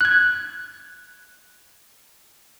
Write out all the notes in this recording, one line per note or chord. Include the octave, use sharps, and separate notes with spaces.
F#6 G#6